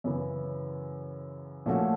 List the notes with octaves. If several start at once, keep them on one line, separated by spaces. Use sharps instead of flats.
F#2 C#3 E3
A#2 F3 A3 C#4 F#4